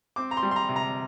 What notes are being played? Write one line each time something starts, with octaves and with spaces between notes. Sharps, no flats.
C4 D6
A#5
C6
G3
C6
A#5
C3
A#5